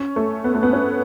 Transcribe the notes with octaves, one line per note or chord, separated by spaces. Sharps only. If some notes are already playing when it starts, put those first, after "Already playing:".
Already playing: C#4
A3
B3
A3
B3
C#4